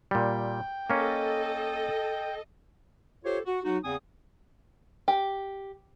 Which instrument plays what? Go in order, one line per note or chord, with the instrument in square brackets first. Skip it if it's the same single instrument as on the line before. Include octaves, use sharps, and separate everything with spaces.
[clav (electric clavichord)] A#2 G3 [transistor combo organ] G5
[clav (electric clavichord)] A#3 C#4 [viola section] A4 D#5
[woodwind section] F4 G4 A4 C5 C#5
F#4
F#3 D#4 F#4
E2 C#3 B3 C4 G#5 D#6
[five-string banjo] G4